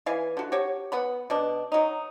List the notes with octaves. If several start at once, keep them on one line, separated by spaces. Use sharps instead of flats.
E3 D5 F5 G#5
D3 F#4
F#4 G4 C#5
B3 F#5 B5
B2 D4
F#3 D#4